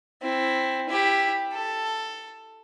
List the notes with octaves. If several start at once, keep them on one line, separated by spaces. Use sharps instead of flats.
C4 E4
E4 G4
A4